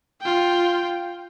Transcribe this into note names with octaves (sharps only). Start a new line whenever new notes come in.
F4 G5